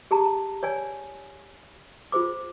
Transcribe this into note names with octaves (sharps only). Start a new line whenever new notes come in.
G4 G#4 A5 A#5
C#5 D5 G#5
F4 G#4 C5 D6